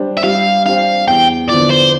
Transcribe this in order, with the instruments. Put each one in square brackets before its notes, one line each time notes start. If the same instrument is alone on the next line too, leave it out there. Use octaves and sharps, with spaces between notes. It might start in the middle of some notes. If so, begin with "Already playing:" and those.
Already playing: [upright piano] G3 D4 G4 C5
[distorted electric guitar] E5
[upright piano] G3 [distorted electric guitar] F5
[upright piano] D4 G4 C5 [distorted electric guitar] F5
[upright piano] E2 [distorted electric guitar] G5
[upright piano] D3 F3 B3 E4 [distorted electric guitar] D5
[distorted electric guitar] C5